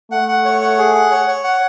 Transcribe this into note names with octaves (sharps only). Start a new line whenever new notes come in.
A3 F#5
F#5
C#5
F#5
G#4
F#5
C#5
C#5
F#5